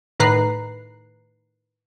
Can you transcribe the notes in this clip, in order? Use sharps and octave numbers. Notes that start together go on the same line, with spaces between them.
A2 D#3 B4 A#5 F#6 C7